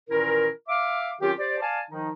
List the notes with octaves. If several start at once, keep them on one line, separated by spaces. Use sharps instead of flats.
A#2 D#3 E3 C#4 E4 A#4
E5 F5 D6
D#3 F#3 C4 C#4 F4 G4
G4 C5 D5
D5 F5 G#5 A5
D#3 F3 D#4